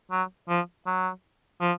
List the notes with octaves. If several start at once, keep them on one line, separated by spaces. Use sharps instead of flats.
F#3
F3
F#3
F3